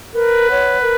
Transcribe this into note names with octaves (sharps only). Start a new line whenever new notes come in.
A#4 B4
C#5 F#5
A#4